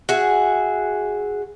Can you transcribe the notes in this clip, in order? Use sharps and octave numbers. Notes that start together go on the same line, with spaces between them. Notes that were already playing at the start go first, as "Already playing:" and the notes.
F#4 G#4 E5